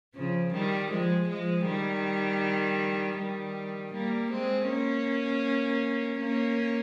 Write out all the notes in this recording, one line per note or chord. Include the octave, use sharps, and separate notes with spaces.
C#3 F3
D#3 G3
F3 G#3
F3 G#3
D#3 G3
D#3 G3
G3 A#3
G#3 C4
A#3 C#4
A#3 C#4